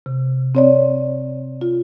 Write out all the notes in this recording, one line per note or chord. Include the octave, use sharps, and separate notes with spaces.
C3
C4 C#5 D5
F4